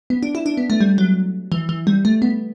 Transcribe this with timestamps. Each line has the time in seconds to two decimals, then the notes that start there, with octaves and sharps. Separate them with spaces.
0.10 B3
0.23 D4
0.35 E4
0.46 D4
0.57 B3
0.70 A3
0.81 G3
0.98 F#3
1.52 E3
1.69 E3
1.87 G3
2.05 A3
2.22 B3